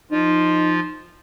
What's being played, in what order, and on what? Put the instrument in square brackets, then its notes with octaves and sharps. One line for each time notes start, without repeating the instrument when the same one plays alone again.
[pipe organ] F3 F4 [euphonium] D#4